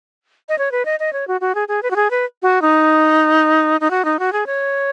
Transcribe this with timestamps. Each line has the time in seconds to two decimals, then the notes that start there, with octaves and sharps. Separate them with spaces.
0.49 D#5
0.58 C#5
0.72 B4
0.85 D#5
1.00 D#5
1.13 C#5
1.28 F#4
1.41 F#4
1.55 G#4
1.68 G#4
1.83 B4
1.91 F#4
1.96 G#4
2.10 B4
2.43 F#4
2.62 D#4
3.81 D#4
3.91 F#4
4.05 D#4
4.19 F#4
4.33 G#4
4.46 C#5